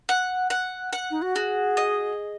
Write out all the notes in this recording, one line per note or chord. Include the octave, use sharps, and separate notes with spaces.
F#5
F#5
F#5
D#4
F#4
F#4 G#4
D#5